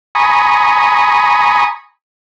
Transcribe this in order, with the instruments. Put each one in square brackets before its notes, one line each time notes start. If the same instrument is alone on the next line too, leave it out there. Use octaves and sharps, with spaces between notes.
[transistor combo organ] G#5 A#5 B5 C#6 D#6